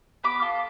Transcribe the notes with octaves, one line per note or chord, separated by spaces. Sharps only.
B3 B5 D6
F4 A4